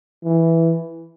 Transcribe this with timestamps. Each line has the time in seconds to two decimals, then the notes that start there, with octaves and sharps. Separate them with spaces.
0.24 E3